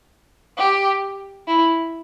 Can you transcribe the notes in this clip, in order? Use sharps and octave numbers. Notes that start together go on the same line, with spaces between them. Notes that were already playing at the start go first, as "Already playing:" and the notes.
G4
E4